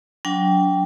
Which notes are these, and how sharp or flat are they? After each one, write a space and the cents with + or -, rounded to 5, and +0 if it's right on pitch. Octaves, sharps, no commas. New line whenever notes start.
F#3 -10 D4 -30 G5 +0